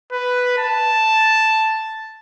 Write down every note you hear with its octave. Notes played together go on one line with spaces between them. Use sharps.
B4
A5